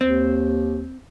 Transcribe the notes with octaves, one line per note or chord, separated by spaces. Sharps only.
D#2 C4